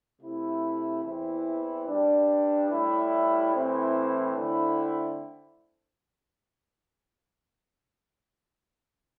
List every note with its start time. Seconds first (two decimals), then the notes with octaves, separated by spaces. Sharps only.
0.21 C3 A3 E4
1.04 E2 E3 C4 E4
1.87 G2 G3 D4
2.70 A2 G3 E4
3.53 A2 E3 C4 E4
4.36 D3 A3 C4 E4